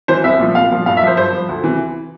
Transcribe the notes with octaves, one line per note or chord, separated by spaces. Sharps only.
E3 C5
C2 E5
A#2 F3
C2 F5
A#2 F3
G2 F5
E5
F3 C5
G2 C5
F3
D2
C3 E3